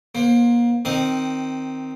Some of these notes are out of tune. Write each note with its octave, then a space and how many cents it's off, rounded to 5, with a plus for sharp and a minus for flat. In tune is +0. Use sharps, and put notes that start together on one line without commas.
A#3 +35 C5 +15
D#3 +0 C4 +0 D#5 -30